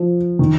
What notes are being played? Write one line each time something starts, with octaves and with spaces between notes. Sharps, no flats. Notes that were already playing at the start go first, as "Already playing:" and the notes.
Already playing: F3
D#3